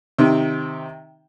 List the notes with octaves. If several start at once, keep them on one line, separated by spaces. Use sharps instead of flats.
C3 D#3